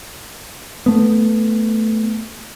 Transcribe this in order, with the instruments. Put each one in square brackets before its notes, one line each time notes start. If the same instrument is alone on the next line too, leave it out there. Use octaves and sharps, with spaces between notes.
[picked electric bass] A3 B3